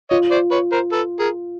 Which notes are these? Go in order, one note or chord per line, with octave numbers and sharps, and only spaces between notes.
F4 C#5 D#5
C5 D5
B4 C#5
A#4 C5
A4 B4
G#4 A#4